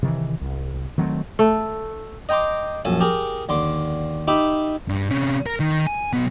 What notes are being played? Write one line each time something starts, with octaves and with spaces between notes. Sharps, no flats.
C3 D#3 E3
C2
D#3 F#3 A3 C4
A3
D#5 G5 A#5 C6 D6
A#1 F#2 A4 G#5 A5
G4 G#4 A#4
D#2 D3 C6 D6
D#4 G4 E5 B5 D6
G2
C3 C#4
A#4
D#3
G#5
B1 B3